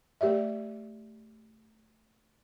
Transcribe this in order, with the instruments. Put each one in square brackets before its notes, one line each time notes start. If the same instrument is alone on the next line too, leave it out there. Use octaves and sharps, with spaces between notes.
[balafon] A3 G4 D5 E5